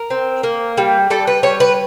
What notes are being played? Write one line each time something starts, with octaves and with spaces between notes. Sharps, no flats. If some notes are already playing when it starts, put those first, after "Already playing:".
Already playing: A#4
C4
A#3
G3
G3 A4
B4
G3 C#5
B4